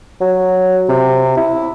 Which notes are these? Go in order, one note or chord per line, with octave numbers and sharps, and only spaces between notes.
F#3
C3
E4